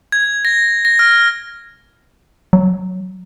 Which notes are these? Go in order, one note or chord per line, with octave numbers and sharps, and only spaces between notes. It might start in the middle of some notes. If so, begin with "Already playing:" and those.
G#6
A#6
A#6
F6
F#3